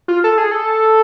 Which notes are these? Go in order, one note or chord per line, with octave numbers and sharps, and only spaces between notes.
F4
A4
G#4
A4